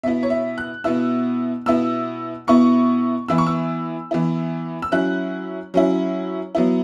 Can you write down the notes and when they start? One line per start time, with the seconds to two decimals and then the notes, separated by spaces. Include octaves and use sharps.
0.03 B2 B3 E4 E5
0.23 C#5
0.30 E5
0.58 F#6
0.84 B2 B3 E4 E6
1.66 B2 B3 E4 E6
2.47 B2 B3 E4 C#6
3.28 E3 B3 E4 E6
3.38 C#6
3.47 E6
4.11 E3 B3 E4
4.82 E6
4.92 F#3 C#4 E4 F#6
5.74 F#3 C#4 E4
6.55 F#3 B3 E4